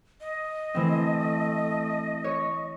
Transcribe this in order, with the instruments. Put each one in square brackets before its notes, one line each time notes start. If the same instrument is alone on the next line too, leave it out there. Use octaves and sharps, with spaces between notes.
[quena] D#5
[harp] E3 C4 [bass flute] A3
[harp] C#5